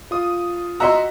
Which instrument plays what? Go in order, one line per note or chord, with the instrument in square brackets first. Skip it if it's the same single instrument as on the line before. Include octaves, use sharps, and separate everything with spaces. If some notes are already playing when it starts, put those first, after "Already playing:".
[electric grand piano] F4 D#6
[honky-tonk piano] F#4 E5 C6 [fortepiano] D#5 A#5 E6